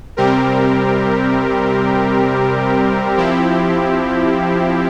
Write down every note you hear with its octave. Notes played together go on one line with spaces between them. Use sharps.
C3 G3 C4 G4 A#4
F3 C4 E4 G4